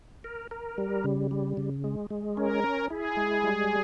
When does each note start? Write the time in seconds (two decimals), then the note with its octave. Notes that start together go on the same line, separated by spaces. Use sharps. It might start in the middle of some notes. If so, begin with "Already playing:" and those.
0.24 A#4
0.51 A#4
0.78 G3
1.04 C#3
1.31 G3
1.57 C#3
1.84 G#3
2.10 G#3
2.37 C#4 A#4
2.64 C#4
2.90 E4 G#4
3.17 G#3
3.44 G3